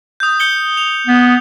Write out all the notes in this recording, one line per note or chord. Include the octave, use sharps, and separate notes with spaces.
D#6 G6
G6 C#7 G7
F7
B3